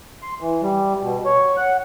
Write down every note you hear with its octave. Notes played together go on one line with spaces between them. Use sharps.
C6
E3
G3
B2
C#5
F#5